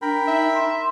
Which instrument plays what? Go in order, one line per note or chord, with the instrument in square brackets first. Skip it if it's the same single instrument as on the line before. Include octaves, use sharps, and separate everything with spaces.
[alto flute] D4 [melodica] A#4 G5 B5
[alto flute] D#4 [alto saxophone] E5
[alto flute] C6